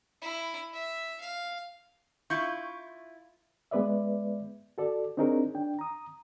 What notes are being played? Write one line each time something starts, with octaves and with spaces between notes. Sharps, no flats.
E4
E5
F5
E4 F4 C#6 G6
G#3 B3 B4 D5 E5
F#4 A4 D5
C4 D4 D#4 G#4 A#4 C#5
D4 G5
A#5 D#6